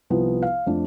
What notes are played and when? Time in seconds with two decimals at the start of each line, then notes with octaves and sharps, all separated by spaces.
0.10 C2 F3 B3
0.42 F5
0.66 F2 A3 D4